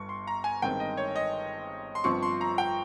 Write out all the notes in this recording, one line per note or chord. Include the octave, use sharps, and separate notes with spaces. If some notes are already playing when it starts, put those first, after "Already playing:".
Already playing: G1 G2 G3 C#6
C6
A#5
G#5
G1 G2 D#3 G#3 C4 G5
D#5
C#5
D#5
C6
G1 G2 F3 C4 C#6
C6
A#5
G5